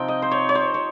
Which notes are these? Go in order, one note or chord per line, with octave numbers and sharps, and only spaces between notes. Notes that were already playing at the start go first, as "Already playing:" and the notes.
Already playing: C3 F3 C4 D#4 G5
D#5
C5
C#5
C#5
C5
C#5